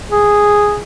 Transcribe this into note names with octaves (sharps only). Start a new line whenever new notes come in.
G#4